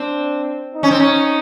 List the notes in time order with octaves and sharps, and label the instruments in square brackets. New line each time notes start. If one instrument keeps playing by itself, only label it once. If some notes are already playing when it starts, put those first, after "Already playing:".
Already playing: [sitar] C4 [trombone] D4
[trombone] D#4
[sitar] C#4
C4
C#4